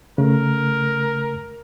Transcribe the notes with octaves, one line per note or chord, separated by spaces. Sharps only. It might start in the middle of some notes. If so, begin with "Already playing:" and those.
C#3 A3 A#4